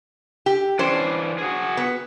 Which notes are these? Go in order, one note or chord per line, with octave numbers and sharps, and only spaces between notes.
G4
E3 C#4 D4 C5
F#4 G#4
B3